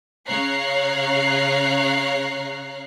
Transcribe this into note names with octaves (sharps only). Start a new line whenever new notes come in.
C#3 C#5 F5 A#5 F#6 C7